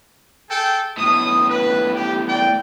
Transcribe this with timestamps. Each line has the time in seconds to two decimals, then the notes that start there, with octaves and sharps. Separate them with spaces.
0.49 G#4 A4 G5
0.97 B1 A2 D#6
1.49 B4
1.94 G4
2.27 A#3 D5 G5